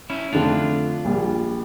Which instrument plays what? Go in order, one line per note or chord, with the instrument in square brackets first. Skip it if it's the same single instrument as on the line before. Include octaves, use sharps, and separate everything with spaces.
[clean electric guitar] C#4 E4
[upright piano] F2 D3 A3 [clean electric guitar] D4 F4
[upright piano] A#1 A#2 G3